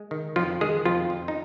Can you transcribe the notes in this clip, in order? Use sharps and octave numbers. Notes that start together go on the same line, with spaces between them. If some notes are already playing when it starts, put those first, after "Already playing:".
Already playing: G#3
D#3
F2 F3 F4
D#3 G#3 G#4
F2 F3 F4
F2
D#4